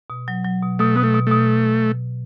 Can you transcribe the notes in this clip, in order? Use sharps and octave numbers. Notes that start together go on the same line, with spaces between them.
B2
F#3
F#3
B2
B2 A3
B2 B3
A3
B2
A3
B2